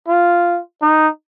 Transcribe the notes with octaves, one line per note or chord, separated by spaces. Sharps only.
F4
D#4